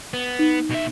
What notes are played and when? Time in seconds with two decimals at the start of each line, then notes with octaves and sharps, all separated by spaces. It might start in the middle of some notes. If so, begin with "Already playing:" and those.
0.14 B3
0.39 D#4
0.71 B2 E5